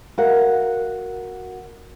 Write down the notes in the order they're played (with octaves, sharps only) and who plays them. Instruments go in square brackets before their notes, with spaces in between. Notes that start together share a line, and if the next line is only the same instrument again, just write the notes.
[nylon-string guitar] F#4 A#4 F5 F#5